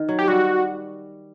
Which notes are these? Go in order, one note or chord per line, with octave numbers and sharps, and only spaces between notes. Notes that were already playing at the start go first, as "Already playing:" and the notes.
Already playing: D#3
F#3
G4
G3 F#4